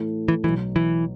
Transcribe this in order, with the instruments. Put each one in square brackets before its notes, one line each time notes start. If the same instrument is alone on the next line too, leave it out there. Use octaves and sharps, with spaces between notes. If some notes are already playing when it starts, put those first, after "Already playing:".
Already playing: [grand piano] A2 E3 A3
[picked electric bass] E3
[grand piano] B1 B2 F#3 [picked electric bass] E3
[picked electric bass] E3